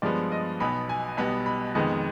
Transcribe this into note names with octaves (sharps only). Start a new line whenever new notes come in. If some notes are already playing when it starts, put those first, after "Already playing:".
G2 F3 G#3 B3 D5
D#5
B1 B2 B3 B5
G#5
B1 B2 G3 B3 B5
B5
F2 D#3 G#3 B3 D#5